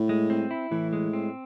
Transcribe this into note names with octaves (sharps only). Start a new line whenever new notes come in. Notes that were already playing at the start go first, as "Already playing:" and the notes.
Already playing: A2
G#3
C4
E4
A2 E3
G#3
C4